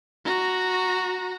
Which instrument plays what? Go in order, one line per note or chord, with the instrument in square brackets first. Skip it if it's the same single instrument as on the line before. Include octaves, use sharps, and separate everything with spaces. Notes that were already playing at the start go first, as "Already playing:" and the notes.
[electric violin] F#4 A#5